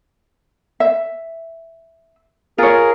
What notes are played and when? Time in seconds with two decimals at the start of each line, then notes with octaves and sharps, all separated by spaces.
0.80 E5
2.58 F4 G#4 A#4 C#5